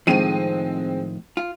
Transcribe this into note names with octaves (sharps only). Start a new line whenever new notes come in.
A2 D#3 F3 G#3 C4 D#7
F4